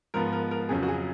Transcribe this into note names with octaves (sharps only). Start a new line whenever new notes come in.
G#2 F3 B3 A#4
A#4
A#4
F2 C#3 F#3 G#4
F#4
G#4